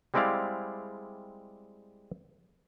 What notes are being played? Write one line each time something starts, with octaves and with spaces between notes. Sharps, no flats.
G3 G#3 C4 E4 D5 F5